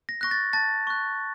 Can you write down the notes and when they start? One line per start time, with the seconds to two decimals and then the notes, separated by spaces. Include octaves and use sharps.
0.09 A#6
0.21 C#6 F#6 A#6
0.31 A6
0.53 A5 A6
0.87 C#6 F#6